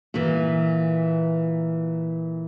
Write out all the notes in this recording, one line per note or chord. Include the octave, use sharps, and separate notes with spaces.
A#2 E3